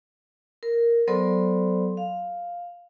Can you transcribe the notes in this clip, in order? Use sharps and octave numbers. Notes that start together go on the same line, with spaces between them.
A#4
F#3 B3 A4 C5 D5 C6
F5